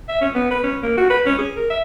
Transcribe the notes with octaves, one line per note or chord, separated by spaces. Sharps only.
E5
C#4
B3
B4
C#4
A#3
F#4
B4
C#4
G#4
A#4
E5